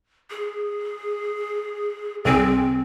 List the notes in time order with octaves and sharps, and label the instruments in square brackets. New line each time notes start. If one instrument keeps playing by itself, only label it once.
[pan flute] G#4
[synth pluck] C2 G#4 [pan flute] C4